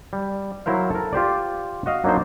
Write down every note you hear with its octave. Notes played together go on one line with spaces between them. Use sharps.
G3
F#3 E4 A#4 C5 F5
A4 A#4
F4 G4 C5 D5
F#4 D#5 F5
F#3 A#3 D4 D#4 C5